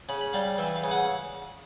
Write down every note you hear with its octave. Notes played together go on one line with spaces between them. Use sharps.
C#3 B5
B5
G3 F5
E3 E5
F5
C#3
F#5